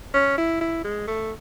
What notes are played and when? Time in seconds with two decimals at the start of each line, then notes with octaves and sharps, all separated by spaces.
0.14 C#4
0.38 E4
0.61 E4
0.84 G#3
1.07 A3